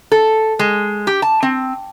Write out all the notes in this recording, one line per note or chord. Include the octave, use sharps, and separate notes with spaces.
A4
G#3
G4
A5
C4